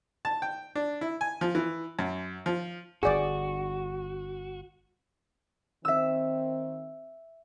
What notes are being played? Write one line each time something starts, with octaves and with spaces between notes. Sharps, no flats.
A5
G5
D4
E4
G#5
F3
E3
F#2
F3
G1 G2 F#4 G#4 D5
D#3 C4 E5 E6